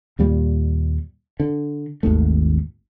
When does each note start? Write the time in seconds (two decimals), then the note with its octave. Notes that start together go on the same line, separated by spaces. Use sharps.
0.19 D#2 A#2 G3
1.40 D3
2.03 G#1 D#2 D#3 A3